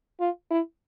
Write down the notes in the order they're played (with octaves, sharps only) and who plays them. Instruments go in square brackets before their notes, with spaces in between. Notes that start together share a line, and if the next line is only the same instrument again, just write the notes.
[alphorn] F4
E4